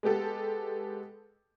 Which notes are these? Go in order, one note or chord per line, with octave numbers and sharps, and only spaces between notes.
G#3 B3 G4 A4